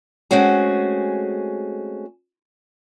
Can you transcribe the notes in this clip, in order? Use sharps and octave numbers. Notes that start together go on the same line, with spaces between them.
G#3 A3 C4 C#4 F#4 G#4